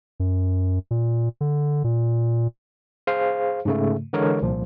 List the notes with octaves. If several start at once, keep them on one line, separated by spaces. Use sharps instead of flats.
F#2
A#2
D3
A#2
G#4 C5 F5
G#2 C#3 A3
D3 E3 G#3 A#4 C#5
C2 A#2 F3